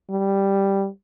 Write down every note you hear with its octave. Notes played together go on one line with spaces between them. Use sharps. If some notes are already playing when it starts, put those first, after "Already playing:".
G3